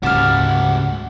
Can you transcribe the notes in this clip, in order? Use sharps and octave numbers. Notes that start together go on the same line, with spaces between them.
D2 G#2 C#3 F#4 G4 F#5 A5 F6